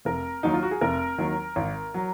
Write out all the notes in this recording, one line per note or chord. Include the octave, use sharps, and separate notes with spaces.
F1 A#4
D#2 D#3 F#3 D#4
F4
F#4
G#4
F1 A#4
D#2 D#3 F#3
G#1
F#3